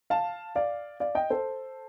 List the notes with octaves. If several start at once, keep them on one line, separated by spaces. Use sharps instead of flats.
F5 A5
D5 F5
D5 F5
D#5 G5
A4 C5